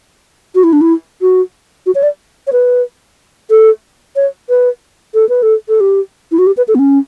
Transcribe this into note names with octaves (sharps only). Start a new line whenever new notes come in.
F#4
E4
D4
E4
F#4
F#4
C#5
D5
C#5
B4
A4
C#5
B4
A4
B4
A4
A4
G4
E4
F#4
G4
B4
A4
B3
C#4